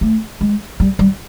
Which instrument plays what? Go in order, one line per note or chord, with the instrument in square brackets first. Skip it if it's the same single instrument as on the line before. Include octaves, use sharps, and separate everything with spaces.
[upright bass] A3
G#3
G3
G3